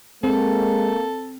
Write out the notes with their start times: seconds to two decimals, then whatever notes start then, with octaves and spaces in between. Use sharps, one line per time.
0.24 G#3 A#3 C4 A4